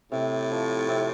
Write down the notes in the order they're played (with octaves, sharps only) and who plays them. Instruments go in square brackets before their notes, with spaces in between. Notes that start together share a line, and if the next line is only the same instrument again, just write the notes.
[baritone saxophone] A2 [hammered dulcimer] C3
[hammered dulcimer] F3
C3